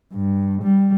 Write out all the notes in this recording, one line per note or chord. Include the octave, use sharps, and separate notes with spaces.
G2
G3